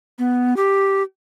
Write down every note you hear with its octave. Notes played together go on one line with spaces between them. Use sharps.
B3
G4